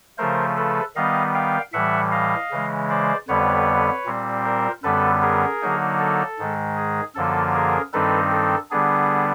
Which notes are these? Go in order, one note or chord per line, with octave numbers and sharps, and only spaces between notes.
C#3 F3 A3 A#4 C5
A4 B4
D#3 G3 B3 D#5 F5
F5 G5
A2 E3 G3 E5 F#5
D#5 F5
C#3 E3 G#3
C5 D5
F2 D3 G3 B3 B4 C#5
A#2 G3 C4
A#4 C5
F#2 D3 G3 B3 A4 B4
G#4 A#4
D3 F#3 A#3 D#4
A4
G#2 D#3 G#3
G#4
F#2 D3 F3 A#3 A4
G#4 A#4
G2 D#3 G3 C4 D#4 A4 B4
A4
D3 G3 B3 D4 G#4